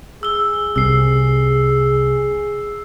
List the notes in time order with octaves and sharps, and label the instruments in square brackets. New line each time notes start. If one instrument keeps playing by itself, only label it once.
[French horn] G#4 [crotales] E6 G7
[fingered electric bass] C2 C3 [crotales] E6 C7